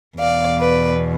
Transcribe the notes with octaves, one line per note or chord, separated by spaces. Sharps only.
E2 B2 D5 F5
B4 D5